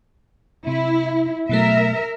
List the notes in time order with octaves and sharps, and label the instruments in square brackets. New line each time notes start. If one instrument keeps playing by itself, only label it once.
[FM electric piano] C3 [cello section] E4
[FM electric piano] B2 F#3 A3 [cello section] A#4 E5